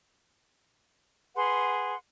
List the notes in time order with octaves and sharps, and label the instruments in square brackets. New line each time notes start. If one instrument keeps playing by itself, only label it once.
[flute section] G#4 B4 F#5 C6